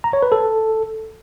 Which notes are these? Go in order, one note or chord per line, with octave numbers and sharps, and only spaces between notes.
A#5
C#5
B4
A4